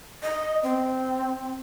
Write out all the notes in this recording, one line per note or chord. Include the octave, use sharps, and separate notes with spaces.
D#5
C4